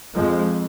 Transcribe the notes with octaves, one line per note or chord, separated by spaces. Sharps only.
F2 F3 G#3